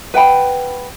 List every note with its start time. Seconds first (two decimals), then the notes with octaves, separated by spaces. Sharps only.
0.14 B4 F#5 G5 B5